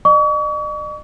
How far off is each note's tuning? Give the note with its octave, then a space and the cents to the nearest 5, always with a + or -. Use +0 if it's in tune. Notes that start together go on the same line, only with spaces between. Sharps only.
D#5 -45 C#6 +40